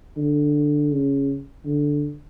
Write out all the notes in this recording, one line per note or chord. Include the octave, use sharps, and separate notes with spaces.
D3
C#3
D3